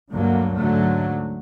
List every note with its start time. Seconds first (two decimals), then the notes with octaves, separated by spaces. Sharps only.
0.11 D2 G2 D3 F#3 A#3
0.56 G#2 D3 F#3 A3